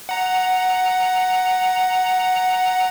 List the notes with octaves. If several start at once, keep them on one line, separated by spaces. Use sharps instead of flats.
F#5 A#5